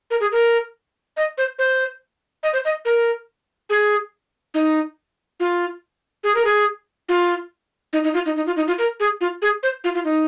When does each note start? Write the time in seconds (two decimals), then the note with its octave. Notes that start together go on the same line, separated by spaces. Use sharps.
0.11 A#4
0.20 G#4
0.32 A#4
1.17 D#5
1.38 C5
1.59 C5
2.43 D#5
2.53 C5
2.65 D#5
2.85 A#4
3.70 G#4
4.54 D#4
5.40 F4
6.24 G#4
6.35 A#4
6.45 G#4
7.09 F4
7.93 D#4
8.04 D#4
8.14 F4
8.26 D#4
8.36 D#4
8.46 F4
8.56 D#4
8.67 F4
8.78 A#4
9.00 G#4
9.21 F4
9.42 G#4
9.63 C5
9.84 F4
9.95 F4
10.05 D#4